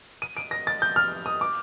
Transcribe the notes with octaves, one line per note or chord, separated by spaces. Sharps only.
D#7
D7
A#6
A6
G6
F6
D#6
D6